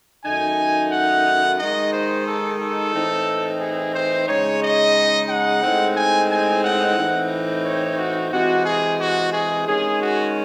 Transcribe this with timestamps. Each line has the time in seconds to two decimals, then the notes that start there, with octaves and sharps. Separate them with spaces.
0.24 F#2 D#3 A3 D#4 G#5
0.92 F#5
1.59 D#3 G#3 D#4 D#5
1.93 C5
2.26 A4
2.60 A4
2.94 A2 E3 C4 D#4
3.61 G#4
3.95 C5
4.28 C#3 G#3 D#4 C#5
4.62 D#5
5.30 F#5
5.63 A2 G#3 C4 D#4
5.97 G#5
6.30 G#5
6.64 F#5
6.98 A2 E3 C4 D#4
7.66 C#5
7.99 F#4
8.33 C3 E3 G#3 F#4
8.66 G#4
9.00 F#4
9.33 G#4
9.67 D#3 G#3 C#4 G#4
10.02 F#4